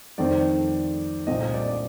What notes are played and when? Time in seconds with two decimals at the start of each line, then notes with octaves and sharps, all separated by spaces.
0.18 F2 D#3 A3 C4 D5
1.27 A#2 A3 C4 D#5
1.40 D#5
1.54 D5
1.68 D5